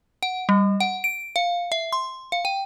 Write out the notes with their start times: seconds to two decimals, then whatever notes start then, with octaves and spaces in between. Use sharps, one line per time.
0.23 F#5
0.49 G3
0.80 F#5
1.04 D7
1.36 F5
1.72 E5
1.92 C6
2.32 F5
2.45 G5